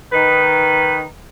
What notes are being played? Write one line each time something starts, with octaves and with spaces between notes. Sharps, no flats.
D#3 D#4 B4